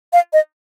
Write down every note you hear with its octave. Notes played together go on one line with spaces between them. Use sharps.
F5
D#5